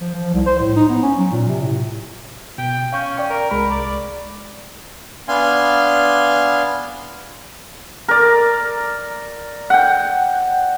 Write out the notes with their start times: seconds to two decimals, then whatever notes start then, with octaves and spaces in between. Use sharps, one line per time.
0.01 F3
0.14 F3
0.33 C2
0.46 C5
0.59 A2
0.76 D#4
0.89 B3
1.03 C#4
1.18 F#3
1.32 A#2
1.48 C3
1.61 A2
2.58 B2 G5
2.93 C#4 F5 C#6 G6
3.17 D5 G5 C#6
3.30 A#4
3.51 C2 G#3 A#4 B5
3.70 D5
5.28 B3 D4 F5 G#5 C6
8.08 A#4 D5
9.70 F#5 G5